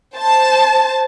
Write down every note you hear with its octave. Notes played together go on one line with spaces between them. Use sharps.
C5 A5